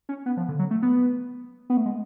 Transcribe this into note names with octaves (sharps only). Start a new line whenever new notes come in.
C#4
B3
F3
D3
F#3
A3
B3
B3
A3
G#3